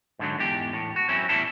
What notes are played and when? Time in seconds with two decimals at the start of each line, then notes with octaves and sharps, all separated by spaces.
0.19 G#2 D3 F#3
0.39 E2 G#2 G4
0.73 A2
0.96 F#4
1.09 F#3 C4 C#4 E4
1.29 E2 A2 G3 E4 A4